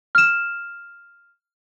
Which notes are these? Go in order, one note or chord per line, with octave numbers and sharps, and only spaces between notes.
F6 E7